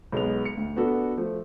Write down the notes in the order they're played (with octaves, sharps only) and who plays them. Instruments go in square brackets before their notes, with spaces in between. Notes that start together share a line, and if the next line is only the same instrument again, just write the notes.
[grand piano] B1 G#3 B3 F7
C#7
D2
B3 D4 F#4 A4
F3 A3